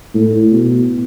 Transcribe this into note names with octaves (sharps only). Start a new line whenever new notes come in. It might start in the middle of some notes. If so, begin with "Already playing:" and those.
A2
B2